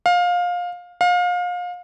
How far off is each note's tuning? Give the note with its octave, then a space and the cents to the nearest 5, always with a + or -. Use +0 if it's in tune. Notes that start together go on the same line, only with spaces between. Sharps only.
F5 +20
F5 +30